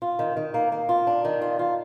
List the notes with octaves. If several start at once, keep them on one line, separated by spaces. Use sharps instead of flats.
F4
D#3
D#3
A#3
A#3
F4
D4
D#3
F4
F4